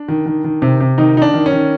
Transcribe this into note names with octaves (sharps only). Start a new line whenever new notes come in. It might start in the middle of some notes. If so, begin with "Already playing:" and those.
Already playing: D4
D#3
D#3
D#3
C3
C3
D#3 D#4
D#3 D#4
D4
D#3
C#4
D#3